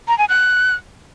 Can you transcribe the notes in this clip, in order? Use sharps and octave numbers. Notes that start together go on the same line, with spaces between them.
A#5
G#5
F#6